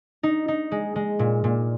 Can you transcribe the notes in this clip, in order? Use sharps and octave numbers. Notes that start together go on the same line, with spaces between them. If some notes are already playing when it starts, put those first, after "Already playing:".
D#4
D#4
G#3
G#3
A#2
A#2